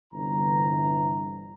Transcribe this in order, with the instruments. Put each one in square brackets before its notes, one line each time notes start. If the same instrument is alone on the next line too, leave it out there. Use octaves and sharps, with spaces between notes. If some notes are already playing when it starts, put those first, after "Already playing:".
[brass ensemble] G1 G2 C3 E3 A#5